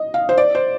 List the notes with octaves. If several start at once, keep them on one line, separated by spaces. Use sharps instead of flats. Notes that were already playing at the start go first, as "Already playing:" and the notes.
Already playing: D#5
F5
C5
D5
C5